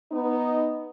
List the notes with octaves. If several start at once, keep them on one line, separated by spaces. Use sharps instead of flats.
B3 D#4